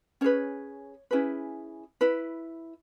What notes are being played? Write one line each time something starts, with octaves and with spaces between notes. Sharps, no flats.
C#4 G#4 B4 C#5
C#4 E4 G#4 B4
E4 B4